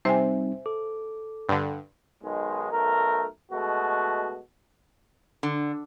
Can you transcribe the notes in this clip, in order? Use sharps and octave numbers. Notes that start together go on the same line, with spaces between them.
C3 G3 C4 D#4 C5 E5 G#5
A4 D6
G2 D3
B1 D#3 G#3
B1 A3 A#4
B2 G#3 A3 F#4
D3